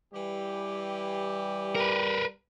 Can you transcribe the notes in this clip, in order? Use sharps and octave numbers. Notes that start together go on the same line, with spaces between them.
E3 G3 G4
A#4 B4